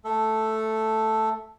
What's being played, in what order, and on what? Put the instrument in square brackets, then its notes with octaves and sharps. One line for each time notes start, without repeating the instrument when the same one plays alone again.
[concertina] A3 A4